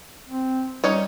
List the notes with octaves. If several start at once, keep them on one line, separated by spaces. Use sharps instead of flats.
C4
G3 C#4 D#4 C#5